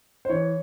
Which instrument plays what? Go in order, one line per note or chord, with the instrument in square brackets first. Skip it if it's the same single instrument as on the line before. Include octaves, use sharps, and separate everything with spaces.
[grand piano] C5
E3 C#5